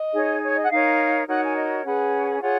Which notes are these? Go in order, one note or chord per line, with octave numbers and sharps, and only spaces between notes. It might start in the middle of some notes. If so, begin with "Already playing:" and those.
Already playing: D#5
D#4 G#4 C#5
C#5
D#5
F#5
D#4 A#4 C#5 F5
D#4 F#4 A#4 C#5 F#5
G#5
D#5
C#4 G#4 B4 F#5
F4 G#4 C#5 F#5